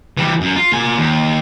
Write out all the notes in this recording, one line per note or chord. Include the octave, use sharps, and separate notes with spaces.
E3 G3
F#2
F4
A#2 G#5
D#2